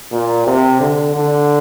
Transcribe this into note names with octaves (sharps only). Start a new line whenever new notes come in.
A#2
C3
D3
D3